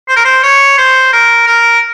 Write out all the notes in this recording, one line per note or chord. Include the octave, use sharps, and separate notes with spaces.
C5
A#4
C5
C#5
C5
A#4
A#4